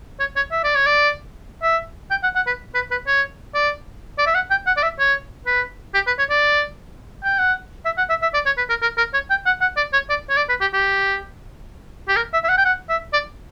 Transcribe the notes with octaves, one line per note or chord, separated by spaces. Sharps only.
C#5
C#5
E5
D5
C#5
D5
E5
G5
F#5
F#5
B4
B4
B4
C#5
D5
D5
E5
F#5
G5
F#5
D5
E5
C#5
B4
G4
B4
C#5
D5
G5
F#5
E5
F#5
E5
E5
D5
C#5
B4
A#4
A#4
A#4
C#5
G5
F#5
F#5
D5
C#5
D5
C#5
D5
B4
G4
G4
G4
A#4
E5
E5
F#5
G5
F#5
E5
D5